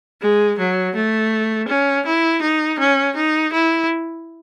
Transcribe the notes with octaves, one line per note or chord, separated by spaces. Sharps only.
G#3
F#3
A3
C#4
E4
D#4
C#4
D#4
E4